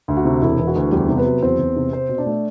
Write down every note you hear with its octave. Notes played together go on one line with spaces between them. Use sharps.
D2
F#4
C3
E1 E4
E3
F#4
D2
E2 G3 G4
C3
B3 B4
F#3
E2 C4 C5
E2
C3
C4 C5
B2
D4 D5
A3